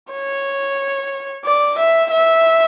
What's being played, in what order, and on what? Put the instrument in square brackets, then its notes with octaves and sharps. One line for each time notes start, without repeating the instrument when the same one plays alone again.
[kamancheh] C#5
D5
E5
E5